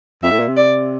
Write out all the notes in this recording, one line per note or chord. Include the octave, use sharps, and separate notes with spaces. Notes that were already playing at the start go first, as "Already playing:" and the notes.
F2 E5
A2
A#2
C3
D5